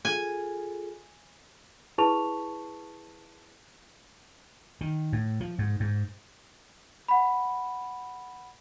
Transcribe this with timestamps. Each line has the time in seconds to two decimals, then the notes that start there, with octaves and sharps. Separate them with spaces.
0.05 F4 G#4 A4 G#5
1.98 E4 G#4 B4 A5 C#6 F7
4.81 D#3
5.12 A2
5.41 F3
5.59 G#2
5.80 G#2
7.08 F#5 B5